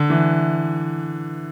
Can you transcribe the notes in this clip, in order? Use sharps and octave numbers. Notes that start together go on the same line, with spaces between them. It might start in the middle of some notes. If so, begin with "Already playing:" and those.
Already playing: D3
E3